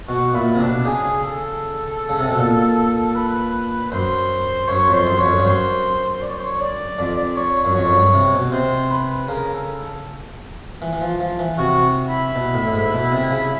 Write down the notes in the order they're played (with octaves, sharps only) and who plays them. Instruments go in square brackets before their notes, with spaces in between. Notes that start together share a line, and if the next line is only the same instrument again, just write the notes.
[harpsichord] B2 [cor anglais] F#4
[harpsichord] A#2 [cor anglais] E4
[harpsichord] C3
[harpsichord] B2 [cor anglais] D4
[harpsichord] C#3 [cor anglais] G#4
[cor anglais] A4
[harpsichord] C#3
C3
B2
A#2
[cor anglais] B4
[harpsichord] F#2 [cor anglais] C5
[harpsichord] F#2 [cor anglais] C#5
[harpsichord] F2
[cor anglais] C5
[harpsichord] F#2
[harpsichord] F2 [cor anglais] C#5
[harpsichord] F#2
G2
[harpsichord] F#2 [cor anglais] C5
[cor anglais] D5
C#5
C5
C#5
D5
[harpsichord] F2 [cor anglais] D5
[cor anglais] D5
C#5
C#5
[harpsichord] F#2
[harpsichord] F2 [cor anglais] C#5
[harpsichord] F#2
G2
C3
B2
[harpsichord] C3 [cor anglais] C5
[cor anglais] B4
[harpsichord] C#3 [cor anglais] A#4
[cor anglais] A4
[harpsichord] E3
E3
F3
F3
E3
[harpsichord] C3 [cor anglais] F#4
[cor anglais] E4
[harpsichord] B2
A2
A2
G#2
B2
C3
C#3